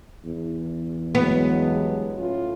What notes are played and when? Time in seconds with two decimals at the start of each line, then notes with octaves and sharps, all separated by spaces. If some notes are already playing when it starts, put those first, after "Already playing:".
0.25 E2
1.15 G2 F#3 G#3 B3
2.18 A2 C#4 F4